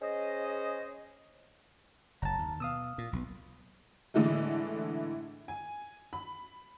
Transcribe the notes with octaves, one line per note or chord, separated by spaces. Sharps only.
C#4 G#4 C5 D#5
F#1 A5 A#5
D#2
B2 F5 D#6 E6
A#2
B1 B2
A2 D3 E3 G#3 A3
G#5
B5